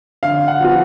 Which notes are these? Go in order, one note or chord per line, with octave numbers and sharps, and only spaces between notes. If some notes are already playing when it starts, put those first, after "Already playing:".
D3 F5
F#5
F3 B3 F4